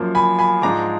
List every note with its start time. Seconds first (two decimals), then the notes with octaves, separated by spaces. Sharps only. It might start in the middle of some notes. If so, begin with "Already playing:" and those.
Already playing: F#2 F3 A#3
0.15 G#5 B5
0.39 G#5 B5
0.62 G#2 F3 G#3 D4 A#5 D6